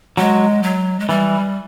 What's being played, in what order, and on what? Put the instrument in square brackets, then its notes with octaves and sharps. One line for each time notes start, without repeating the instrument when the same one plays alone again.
[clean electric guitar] F#3 [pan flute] G#3
[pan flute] F#3
G#3
[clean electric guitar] E3 [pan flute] G3